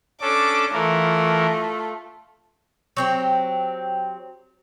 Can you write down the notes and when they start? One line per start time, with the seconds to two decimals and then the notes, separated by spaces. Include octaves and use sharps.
0.21 C#4 D4 A4 D6
0.72 E3 A3 F4 A#4
2.97 F#3 C4 G4